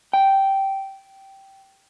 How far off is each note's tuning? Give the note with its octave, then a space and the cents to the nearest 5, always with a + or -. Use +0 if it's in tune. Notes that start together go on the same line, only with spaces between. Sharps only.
G5 -10